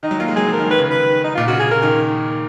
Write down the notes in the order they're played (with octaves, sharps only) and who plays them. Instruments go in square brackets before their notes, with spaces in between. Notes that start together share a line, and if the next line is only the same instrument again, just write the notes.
[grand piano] D#3 [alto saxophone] D#4
[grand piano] F#3
[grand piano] A#3 [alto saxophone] F4
[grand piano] G#3
[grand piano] F#3 [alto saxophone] G#4
[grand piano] F3
[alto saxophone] A#4
[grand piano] D#3
[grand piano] D#3 [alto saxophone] B4
[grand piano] C#3
D#3
[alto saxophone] B4
D#4
[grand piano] A#2 [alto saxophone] F4
[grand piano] C#3 [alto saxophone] F#4
[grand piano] C#3 [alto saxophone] G#4
[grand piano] C#3 [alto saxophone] A#4
[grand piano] D#3